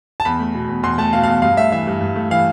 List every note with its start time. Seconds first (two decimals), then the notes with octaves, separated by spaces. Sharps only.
0.20 A5
0.25 E2 B5
0.40 A3
0.54 B2
0.69 E2
0.83 E2 C6
0.98 A3 A5
1.13 B2 F5
1.23 E2 F5
1.42 G2 F5
1.57 A3 E5
1.72 E3 E5
1.87 G2
2.01 G2
2.16 A3
2.30 E3 F5